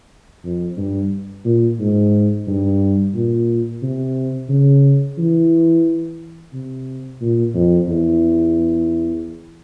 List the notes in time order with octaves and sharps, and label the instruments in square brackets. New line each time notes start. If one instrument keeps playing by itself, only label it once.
[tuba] F2
G2
A#2
G#2
G2
A#2
C3
C#3
E3
C3
A#2
F2
E2